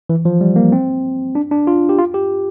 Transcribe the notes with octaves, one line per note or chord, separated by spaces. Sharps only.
E3
F3
G3
A#3
C4
D4
D4
F4
G4
F4
G4